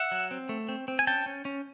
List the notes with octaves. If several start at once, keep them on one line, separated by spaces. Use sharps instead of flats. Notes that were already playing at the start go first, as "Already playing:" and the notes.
Already playing: E5 F#5
F#3
C4
A3
C4
C4
G#5
C#4 G5 A5
C#4
C#4